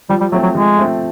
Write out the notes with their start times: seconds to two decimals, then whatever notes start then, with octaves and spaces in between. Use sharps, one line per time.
0.09 F3 G3
0.21 G3
0.32 F#3 A3
0.35 C4
0.43 F#3
0.55 F3 G#3
0.77 A3 C4